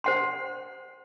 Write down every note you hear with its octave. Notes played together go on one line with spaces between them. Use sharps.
C5 F#5 C6